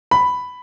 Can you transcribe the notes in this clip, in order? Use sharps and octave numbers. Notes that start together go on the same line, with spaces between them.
B5